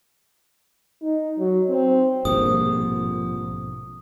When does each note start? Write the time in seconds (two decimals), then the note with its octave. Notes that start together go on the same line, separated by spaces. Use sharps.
1.02 D#4
1.38 F#3
1.69 C4
2.25 A#1 G#2 B2 D3 F3 G3 C4 D#6